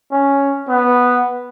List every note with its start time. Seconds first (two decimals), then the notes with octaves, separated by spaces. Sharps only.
0.11 C#4
0.68 B3